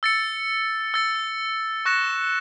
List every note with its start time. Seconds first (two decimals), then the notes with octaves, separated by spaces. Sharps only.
0.03 E6 A6 C#7
0.94 E6 A6 C#7
1.85 C#6 F#6 A#6 C#7 E7